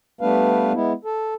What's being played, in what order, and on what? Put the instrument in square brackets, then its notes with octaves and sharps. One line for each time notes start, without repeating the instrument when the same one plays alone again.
[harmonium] G3 A3 B3 D4 B4 F5
G#3 B3 E4
A4